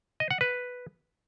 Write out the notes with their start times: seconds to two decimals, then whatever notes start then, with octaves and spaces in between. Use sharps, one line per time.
0.20 D#5
0.31 F#5
0.41 B4